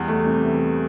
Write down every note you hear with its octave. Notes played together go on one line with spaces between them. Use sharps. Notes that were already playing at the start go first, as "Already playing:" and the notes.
Already playing: E2 G3
A3
C3
E3